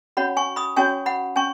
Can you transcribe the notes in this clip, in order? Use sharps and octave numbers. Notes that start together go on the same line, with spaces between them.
C#4 F#4 C#5 F#5 B5
G#5 C#6
B5 D#6
C#4 F#4 C#5 G#5 C#6
F#5 B5
C#4 G#5 C#6